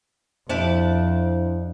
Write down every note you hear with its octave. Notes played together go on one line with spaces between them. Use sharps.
F2 D4 E4 G4 C5